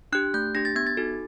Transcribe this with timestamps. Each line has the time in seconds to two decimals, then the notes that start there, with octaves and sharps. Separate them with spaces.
0.12 D4 G4 F#6
0.34 A3 G6
0.55 D4 G4 A#6
0.65 A6
0.76 B3 G#6
0.87 A6
0.97 D#4 F#4 A4